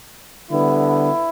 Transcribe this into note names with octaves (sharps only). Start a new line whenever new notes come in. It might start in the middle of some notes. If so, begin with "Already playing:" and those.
D3 G3 B3 E4